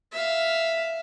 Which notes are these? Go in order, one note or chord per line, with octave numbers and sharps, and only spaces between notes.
E5 F5